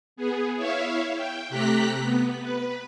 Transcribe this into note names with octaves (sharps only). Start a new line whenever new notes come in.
B3 G#4
E4 C#5 E5 F5
G5
C3 A3 G4 A#5 F#6 B6
B3
B4